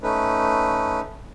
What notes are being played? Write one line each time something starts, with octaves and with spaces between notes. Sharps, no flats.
A3 C#4 D#4 B4